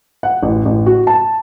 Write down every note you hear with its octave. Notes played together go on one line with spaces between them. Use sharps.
F#5
A1
A1
F#4
A5